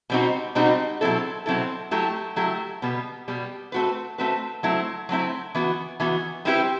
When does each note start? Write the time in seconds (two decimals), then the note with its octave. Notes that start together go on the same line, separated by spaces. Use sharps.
0.10 B2 G3 C4 D#4 F#4
0.55 B2 G3 C4 D#4 F#4
1.01 B2 F#3 C4 E4 A4
1.46 B2 F#3 C4 E4 A4
1.91 F#3 A3 E4 G4
2.36 F#3 A3 E4 G4
2.82 B2 G3 B3
3.28 B2 G3 B3
3.72 A3 C4 F#4 B4
4.18 A3 C4 F#4 B4
4.63 F#3 A3 C4 E4
5.09 F#3 A3 C4 E4
5.55 E3 B3 F#4
6.00 E3 B3 F#4
6.45 G3 C4 E4 G4 B4